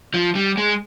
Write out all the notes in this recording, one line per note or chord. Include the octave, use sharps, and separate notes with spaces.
F3
G3
G#3